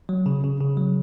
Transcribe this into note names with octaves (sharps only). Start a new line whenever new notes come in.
F#3
C#3
C#3
C#3
F#3